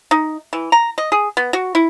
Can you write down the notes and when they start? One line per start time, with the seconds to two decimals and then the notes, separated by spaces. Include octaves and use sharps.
0.11 D#4
0.53 E3
0.72 A#5
0.98 D#5
1.12 G#4
1.37 B3
1.53 F#4
1.75 E4